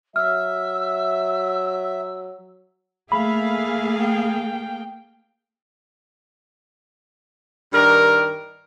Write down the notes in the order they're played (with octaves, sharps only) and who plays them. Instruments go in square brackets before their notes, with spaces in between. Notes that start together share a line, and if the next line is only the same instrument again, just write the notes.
[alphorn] F#3 [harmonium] E5 [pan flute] E6 [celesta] F6
[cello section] A3 G#4 F5 [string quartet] A#3 [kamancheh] E5 [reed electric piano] B5
[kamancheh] G5
[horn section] G2 D#3 D4 A#4